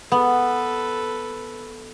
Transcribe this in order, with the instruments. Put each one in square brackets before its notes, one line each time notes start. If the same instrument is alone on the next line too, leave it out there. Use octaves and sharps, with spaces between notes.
[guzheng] B3 [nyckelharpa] A4 B4